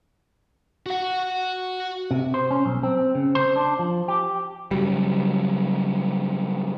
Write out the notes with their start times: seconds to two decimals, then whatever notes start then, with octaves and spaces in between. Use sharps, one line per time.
0.86 F#4 F#5
2.11 C3
2.34 C5
2.50 C#4
2.66 B1
2.83 C4
3.15 C#3
3.35 C5
3.56 D4
3.79 F3
4.08 G4
4.71 C#3 F#3 G3